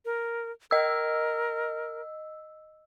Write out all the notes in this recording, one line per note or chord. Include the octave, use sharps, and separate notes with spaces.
A#4
A#4 D#5 E6